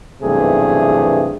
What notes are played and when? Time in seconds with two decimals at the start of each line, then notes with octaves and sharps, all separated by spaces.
0.22 B1 E2 G2 C3 A3 G#4